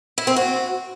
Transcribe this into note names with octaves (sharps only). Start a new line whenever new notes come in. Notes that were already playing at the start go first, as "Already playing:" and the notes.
E4
C4
F#4